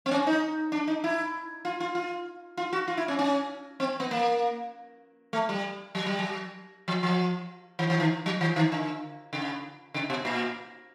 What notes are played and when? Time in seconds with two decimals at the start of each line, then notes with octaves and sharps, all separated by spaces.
0.06 C4
0.11 C#4
0.27 D#4
0.72 D4
0.87 D#4
1.04 E4
1.65 F4
1.80 F4
1.95 F4
2.57 F4
2.73 F#4
2.88 F4
2.97 E4
3.08 C#4
3.19 C#4
3.80 C4
4.00 B3
4.11 A#3
5.33 A3
5.49 G3
5.95 F#3
6.06 G3
6.19 F#3
6.88 F3
7.03 F3
7.79 E3
7.90 E3
8.00 D#3
8.26 F#3
8.41 E3
8.56 D#3
8.72 D3
9.33 C#3
9.94 C#3
10.10 B2
10.25 A#2